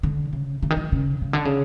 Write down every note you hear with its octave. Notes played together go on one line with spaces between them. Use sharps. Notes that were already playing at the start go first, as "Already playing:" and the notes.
D3
C#3
D3
D#3
E3
C#3
C#3
D3
C#3